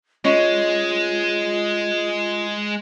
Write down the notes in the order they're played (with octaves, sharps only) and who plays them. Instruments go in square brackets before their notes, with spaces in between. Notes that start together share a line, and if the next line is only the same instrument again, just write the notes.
[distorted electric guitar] G#3 [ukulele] C#4 D#5 [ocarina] F4